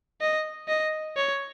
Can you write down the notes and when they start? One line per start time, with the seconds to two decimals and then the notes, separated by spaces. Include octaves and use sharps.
0.21 D#5
0.68 D#5
1.17 C#5